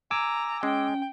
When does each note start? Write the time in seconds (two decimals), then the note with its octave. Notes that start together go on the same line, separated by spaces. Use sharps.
0.11 G#5 A#5 D6 E6
0.63 G#3 C#4 G5